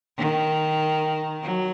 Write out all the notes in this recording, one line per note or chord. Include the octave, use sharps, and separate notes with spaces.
D#3
F#3